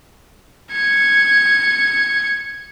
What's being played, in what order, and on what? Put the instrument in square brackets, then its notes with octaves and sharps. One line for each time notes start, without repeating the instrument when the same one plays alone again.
[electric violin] G#6 C#7